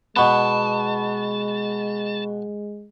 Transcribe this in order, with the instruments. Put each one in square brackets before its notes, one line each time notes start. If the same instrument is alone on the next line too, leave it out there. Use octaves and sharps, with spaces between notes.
[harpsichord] B2 B3 [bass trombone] G#3 [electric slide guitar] A5 [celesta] B5 C#6